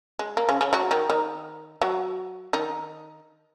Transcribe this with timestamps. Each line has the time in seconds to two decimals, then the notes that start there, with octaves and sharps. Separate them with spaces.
0.19 G#3
0.37 A#3
0.49 C#3 C#4
0.61 C#3 C#4
0.73 F#3 F#4
0.91 D#3 D#4
1.10 D#3 D#4
1.81 F#3 F#4
2.53 D#3 D#4